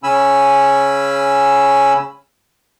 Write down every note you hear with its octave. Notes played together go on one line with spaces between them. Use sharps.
C#3 C#4 G#5 B5 E6